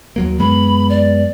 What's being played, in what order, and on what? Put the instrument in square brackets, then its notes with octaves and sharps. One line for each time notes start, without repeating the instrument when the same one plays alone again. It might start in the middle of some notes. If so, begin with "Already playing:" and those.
[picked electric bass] D#2 F#3 A#3
[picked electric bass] F#2 G#3 B3 [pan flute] B5
[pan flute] D5